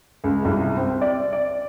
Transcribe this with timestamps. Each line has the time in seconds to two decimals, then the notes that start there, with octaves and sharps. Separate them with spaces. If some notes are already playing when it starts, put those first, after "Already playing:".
0.24 C#2
0.45 C2
0.77 C4
1.01 D5
1.33 D5